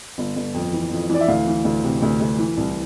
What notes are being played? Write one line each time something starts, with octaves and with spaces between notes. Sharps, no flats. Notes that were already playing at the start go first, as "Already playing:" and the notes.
G1
G1
F2
E3
F2
E3 D5
E5
D2 F5
E3
D2
C3
D2
D2
E3
C2